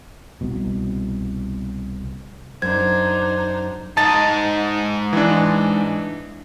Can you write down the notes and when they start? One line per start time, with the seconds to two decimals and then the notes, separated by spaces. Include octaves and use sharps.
0.41 C2 B2
2.62 F#2 D4 D#4 C5 G#6
3.97 G#2 D#4 A5 A6
5.13 E3 D4